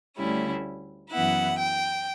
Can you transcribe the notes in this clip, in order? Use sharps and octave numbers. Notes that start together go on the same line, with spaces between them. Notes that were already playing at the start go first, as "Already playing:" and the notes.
D2 D3 G3 C#4 E4
F#2 E3 B3 E4 F#5
G5